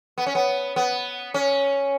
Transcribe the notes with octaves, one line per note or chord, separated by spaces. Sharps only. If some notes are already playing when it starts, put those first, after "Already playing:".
B3
C#4
B3
B3
C#4